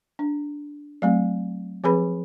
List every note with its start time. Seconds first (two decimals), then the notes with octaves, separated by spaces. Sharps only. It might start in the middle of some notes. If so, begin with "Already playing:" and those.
0.19 D4
1.02 F#3 A3 C4
1.84 F3 C4 G#4 B4 B5